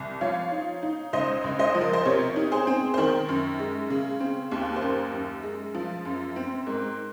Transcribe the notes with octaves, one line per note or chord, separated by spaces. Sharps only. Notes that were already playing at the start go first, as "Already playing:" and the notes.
Already playing: C2
F3 C#5 F5
D#4
D#4
C#2 C5 D#5
C#2
C5 D#5
F3
A#4
C5
C3 A#4 C#5
D#4
G#4 C5
C4
C5
D#3 A#4
F#2
G#3
C#3
C4
D#2
C5
F#2 A#4
F#2
G#3
F3
F#2
C4
G#2 A#4